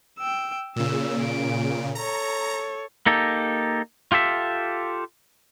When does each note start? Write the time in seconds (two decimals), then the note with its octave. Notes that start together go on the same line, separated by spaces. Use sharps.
0.19 G5 E6
0.76 A#2 C#3 E6
1.22 D7
1.95 A4 C#5 A#5
3.06 A#3 D#4 G4 A4
4.12 F4 G4 A4 E5